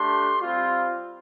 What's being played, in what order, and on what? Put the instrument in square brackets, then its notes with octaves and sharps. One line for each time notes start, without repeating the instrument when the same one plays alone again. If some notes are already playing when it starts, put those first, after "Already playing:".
Already playing: [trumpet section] A3 D4 G4 C6
G3 C4 F4